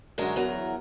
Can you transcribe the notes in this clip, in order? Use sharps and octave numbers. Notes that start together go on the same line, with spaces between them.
F#2 D3 G#3 A#4 C#5 A#5
E2 F#3 A#4